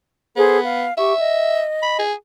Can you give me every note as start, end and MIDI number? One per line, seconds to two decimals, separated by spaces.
0.36 0.86 59
0.36 0.59 68
0.36 0.59 69
0.36 0.59 72
0.63 0.94 77
0.97 1.13 67
0.97 1.63 76
0.97 1.13 85
1.19 2.01 75
1.82 1.97 83
1.99 2.14 68